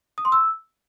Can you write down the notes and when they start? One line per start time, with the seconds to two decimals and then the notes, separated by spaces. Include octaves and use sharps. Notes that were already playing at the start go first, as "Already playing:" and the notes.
0.18 D#6
0.25 C6
0.32 E6